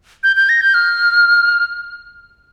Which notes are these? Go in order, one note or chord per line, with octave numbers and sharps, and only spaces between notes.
G6
G6
A#6
G6
F6